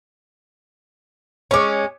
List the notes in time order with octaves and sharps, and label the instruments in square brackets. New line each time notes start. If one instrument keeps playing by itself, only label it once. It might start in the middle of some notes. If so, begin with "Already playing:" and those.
[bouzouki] G#3 C#4 [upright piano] C#5 D6